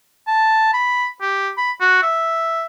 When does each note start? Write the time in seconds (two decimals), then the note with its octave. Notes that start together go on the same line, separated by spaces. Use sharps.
0.27 A5
0.74 B5
1.21 G4
1.58 B5
1.80 F#4
2.03 E5